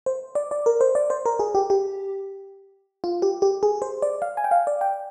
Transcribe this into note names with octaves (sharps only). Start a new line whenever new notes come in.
C5
D5
D5
A#4
C5
D5
C5
A#4
G#4
G4
G4
F4
G4
G4
G#4
C5
D5
F5
G#5
G5
F5
D5
G5